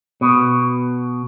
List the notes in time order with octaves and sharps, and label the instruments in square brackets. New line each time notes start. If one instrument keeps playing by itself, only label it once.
[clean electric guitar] B2